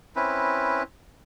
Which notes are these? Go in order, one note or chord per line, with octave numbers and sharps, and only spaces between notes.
C4 C#4 E4 B4